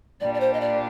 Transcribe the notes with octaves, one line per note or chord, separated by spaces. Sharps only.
A#2 G3 D4 D5
D5
C5
D#5
D5